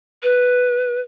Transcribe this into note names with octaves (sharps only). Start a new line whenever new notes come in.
B4